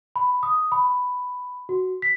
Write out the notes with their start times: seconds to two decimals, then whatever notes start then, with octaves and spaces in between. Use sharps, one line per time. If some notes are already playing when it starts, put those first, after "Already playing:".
0.16 B5
0.43 D#6
0.72 B5
1.69 F#4
2.02 B6